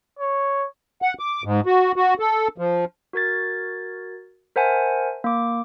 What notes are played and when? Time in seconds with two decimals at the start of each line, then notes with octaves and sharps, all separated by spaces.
0.19 C#5
1.02 F#5
1.19 D6
1.44 G#2
1.66 F#4
1.96 F#4
2.20 A4
2.58 F3
3.13 F#4 A#4 G#6 A6
4.56 A#4 C5 E5 F#5 G#5 A5
5.24 A#3 D6